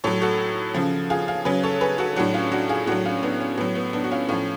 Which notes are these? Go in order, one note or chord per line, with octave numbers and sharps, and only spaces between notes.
A2 F#3 A4 C#5
F#4 A4
C#3 F3
F4 G#4
F4 G#4
C#3 F#3 G#4 B4
A4 C#5
G#4 B4
F#4 A4
A2 F#3 D4 F#4
C#4 F4
D4 F#4
F4 G#4
A2 F#3 D4 F#4
C#4 F4
B3 D4
C#4
A2 F#3 B3
B3
B3 D4
F#4
C#4 F4
A2 F3 C#4 F4